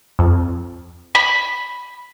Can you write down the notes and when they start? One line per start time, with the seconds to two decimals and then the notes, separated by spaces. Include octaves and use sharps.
0.19 F2
1.15 B5